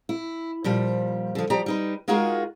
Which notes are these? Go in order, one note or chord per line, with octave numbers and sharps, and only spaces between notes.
E4
A#2 F3 G3
D3 F3
F3 G4 D5 A#5
G3 D#4 B4
G#3 D#4 F4 F#4 G#4 A#4